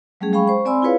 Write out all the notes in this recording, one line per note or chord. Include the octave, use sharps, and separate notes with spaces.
F#3 G3 A3 C#4 G#4
G#3 G#4 F5 G5 B5 C#6
C5 C#6
C4 D5 G#5 B5 C6 E6
E4 F4 G#4 B4 C#5 F5